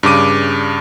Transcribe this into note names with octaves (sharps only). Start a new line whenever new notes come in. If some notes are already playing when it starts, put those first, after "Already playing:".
G2 C#3 D6 D#7